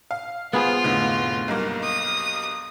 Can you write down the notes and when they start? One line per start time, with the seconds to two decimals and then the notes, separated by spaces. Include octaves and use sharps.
0.11 F5
0.53 B3 F4 G#4 C5
0.84 F1 A2 D3
1.48 B1 G2 A#3
1.83 D#6